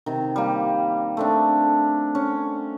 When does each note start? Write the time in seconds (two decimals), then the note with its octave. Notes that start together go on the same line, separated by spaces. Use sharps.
0.06 C3 D#3
0.36 G3 A#3
1.17 A3 C4 D4
2.15 C#4